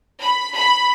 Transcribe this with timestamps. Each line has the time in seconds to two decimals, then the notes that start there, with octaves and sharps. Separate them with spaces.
0.21 B5
0.55 B5